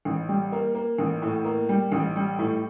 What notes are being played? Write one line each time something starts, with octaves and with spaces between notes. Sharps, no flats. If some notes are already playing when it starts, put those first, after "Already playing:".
A1
G3
A#3
A#3
A1
A2
A#3
G3
A1
G3
A2